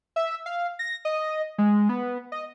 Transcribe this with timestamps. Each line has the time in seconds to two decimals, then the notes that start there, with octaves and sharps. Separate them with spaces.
0.16 E5
0.46 F5
0.79 A#6
1.05 D#5
1.58 G#3
1.89 B3
2.32 D#5